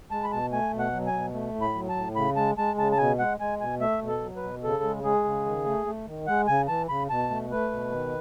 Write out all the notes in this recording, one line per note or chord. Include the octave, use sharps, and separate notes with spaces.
G#3 A5
B5
B2 A5
A3 G#5
B2
F#5
F#3
G#5
B2
A3
A2
B5
F#3
A5
A2
C#3 B5
G#3 A5
G#3 A5
C#3 A5
A5
B2 G#5
G#3 F#5
G#3 G#5
B2 G#5
A3 E5
B2
A4
F#3
B4
B2
C#3 A4
G#3
G#3 G#4
C#3
D#3
A3
A3
D#3
G#3 F#5
C#3 G#5
E3 A5
C#3 B5
B2 A5
A3
A3 B4
B2
D#3